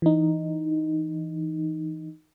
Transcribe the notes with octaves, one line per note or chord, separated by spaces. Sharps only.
E3 D#4